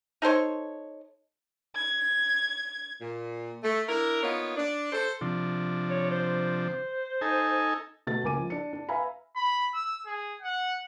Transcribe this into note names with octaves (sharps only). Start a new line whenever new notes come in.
D#4 A4 C5 C#5
G#6
A#2
A3
D4 E4 A#4
A#3 B3 D#4 F4 C#5
D4
A4 C5
C3 F3 D4
C#5
C5
D#4 A4 G#5
B2 A3 A6
C#2 A#4 G#5 D6 D#7
F3
D4 C#7
D4
B4 E5 F5 G#5 A#5 B5
B5
E6
G#4
F#5